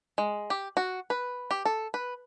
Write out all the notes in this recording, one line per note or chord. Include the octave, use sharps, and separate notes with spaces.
G#3
G4
F#4
B4
G4
A4
B4